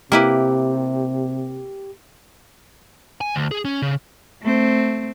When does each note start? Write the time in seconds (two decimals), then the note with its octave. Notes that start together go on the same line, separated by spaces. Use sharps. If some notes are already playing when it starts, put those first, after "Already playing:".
0.12 C3 A#3 E4 G4 B4
3.21 G#5
3.35 D2
3.51 G#4
3.65 C#4
3.82 C#3
4.42 A3 C4